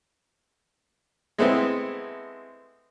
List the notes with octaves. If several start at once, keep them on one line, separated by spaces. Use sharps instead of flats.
G#3 A3 B3 C4 E4